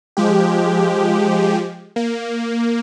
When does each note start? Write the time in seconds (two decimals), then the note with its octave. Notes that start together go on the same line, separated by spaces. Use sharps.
0.17 F3 G#3 G4
1.96 A#3